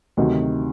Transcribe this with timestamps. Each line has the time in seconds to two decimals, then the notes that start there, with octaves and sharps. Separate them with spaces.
0.17 D2 C3 D#3 F#3